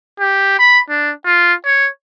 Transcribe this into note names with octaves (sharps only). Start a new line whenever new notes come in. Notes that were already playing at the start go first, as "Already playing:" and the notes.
G4
B5
D4
F4
C#5